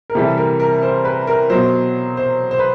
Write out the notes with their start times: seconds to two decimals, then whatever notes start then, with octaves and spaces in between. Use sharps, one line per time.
0.10 A#4
0.15 C3 E3 G3 A4
0.38 A#4
0.60 A#4
0.83 C5
1.05 B4
1.27 A#4
1.50 B2 F#3 C5
2.17 C5
2.51 C5
2.59 B4